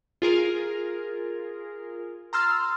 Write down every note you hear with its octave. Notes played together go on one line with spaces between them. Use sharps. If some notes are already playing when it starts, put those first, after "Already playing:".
F4 G#4 A#4
A#5 C6 E6 F6 A6